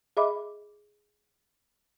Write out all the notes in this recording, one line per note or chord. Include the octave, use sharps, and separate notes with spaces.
G#4 D#5 E5 B5 D6